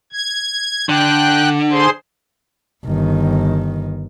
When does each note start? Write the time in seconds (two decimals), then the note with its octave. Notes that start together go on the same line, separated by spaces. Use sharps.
0.12 G#6
0.89 D3 G5 F#6
1.72 G#4 C5 C6
2.85 G1 D#3